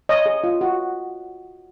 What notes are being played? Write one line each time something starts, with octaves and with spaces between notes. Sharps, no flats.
C#5 D#5
G#4
F4
F#4